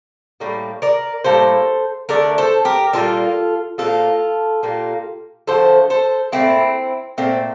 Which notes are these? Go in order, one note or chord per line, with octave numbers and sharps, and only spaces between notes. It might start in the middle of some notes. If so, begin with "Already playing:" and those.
A2 G3 A#3
A#4 D5
A2 G3 A#3 A4 C5
D3 A3 A#4 D5
A4 C5
G4 A#4
A#2 G3 A#3 F4 A4
A#2 F3 A#3 F4 A4
A#2 G3 A#3
D3 F3 A3 A4 C5
A4 C5
A#2 A3 C4 E4
A#2 A3 C4